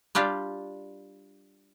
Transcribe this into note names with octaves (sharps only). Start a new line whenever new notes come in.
G3 D4 F4 G4